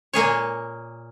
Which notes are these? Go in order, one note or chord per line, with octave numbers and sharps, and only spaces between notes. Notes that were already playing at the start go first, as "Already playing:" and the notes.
A#2 A#3 G#4 C#5